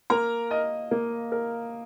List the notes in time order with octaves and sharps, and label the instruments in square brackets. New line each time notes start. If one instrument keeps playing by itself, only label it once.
[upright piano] A#3 [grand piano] A#4 A#5
[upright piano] D#5
A#3
A#4